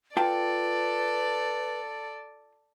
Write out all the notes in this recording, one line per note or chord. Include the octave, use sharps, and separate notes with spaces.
F4 A4 B4 D5 G5 A5